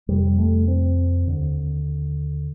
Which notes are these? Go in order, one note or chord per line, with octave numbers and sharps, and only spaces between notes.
F2 C3 G3
A3
C4
D#2 D3